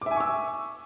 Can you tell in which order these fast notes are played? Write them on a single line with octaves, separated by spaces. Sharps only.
D6 E5 G#5 C#6 E6